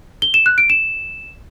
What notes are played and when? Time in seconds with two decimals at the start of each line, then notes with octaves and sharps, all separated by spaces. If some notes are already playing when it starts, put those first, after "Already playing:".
0.22 G7
0.34 E7
0.46 F#6
0.58 D7
0.70 E7